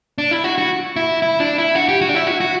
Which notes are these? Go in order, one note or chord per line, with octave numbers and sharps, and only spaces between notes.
D4
E4
F#4
F#4
E4
E4
D4
E4
F#4
G4
F#4
D4
E4
F#4
F#4